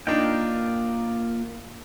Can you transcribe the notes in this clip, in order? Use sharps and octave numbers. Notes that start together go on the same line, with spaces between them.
A#3 D4 D#4 F4 G5